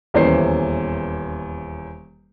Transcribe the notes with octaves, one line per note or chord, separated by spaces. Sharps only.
D#1 E2 E3 C#4 C5 C7